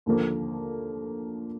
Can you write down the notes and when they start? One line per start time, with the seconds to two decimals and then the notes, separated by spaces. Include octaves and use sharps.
0.06 D#2 D3 F3 A#3